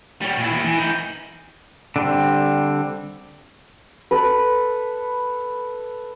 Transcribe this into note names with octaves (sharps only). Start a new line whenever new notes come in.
G3 C#5
A#2 E4
D#2
E3
E3 D#4
D3 G3 C4
A4 B4